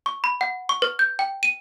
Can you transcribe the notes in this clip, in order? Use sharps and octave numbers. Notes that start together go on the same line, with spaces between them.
C#6
B5
F#5
C#6
B4
G6
G5
D#7